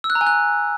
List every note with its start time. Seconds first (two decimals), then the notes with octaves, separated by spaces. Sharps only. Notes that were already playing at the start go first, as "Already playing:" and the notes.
0.04 E6
0.10 F#6
0.15 A#5
0.21 G#5
0.27 F#6